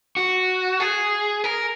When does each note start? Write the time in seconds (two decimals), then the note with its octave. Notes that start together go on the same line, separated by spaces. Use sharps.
0.17 F#4
0.80 G#4
1.44 A#4